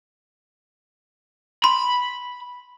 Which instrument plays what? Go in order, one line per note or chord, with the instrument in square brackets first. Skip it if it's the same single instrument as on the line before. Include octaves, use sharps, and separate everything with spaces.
[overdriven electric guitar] B5 [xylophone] C6